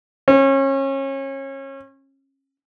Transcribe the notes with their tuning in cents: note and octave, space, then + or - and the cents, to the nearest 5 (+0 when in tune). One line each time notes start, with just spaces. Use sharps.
C#4 -30